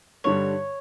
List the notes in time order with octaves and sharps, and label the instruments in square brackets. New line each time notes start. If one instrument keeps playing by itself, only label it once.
[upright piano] G2 D3 G3 [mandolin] C#5